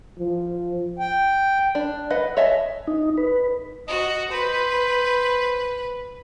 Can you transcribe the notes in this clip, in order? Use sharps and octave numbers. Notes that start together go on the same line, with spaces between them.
F3
G5
D4
B4 D#5 F#5
C#5 D#5 E5 G#5 A5
D#4
B4
F#4 D#5
B4 C5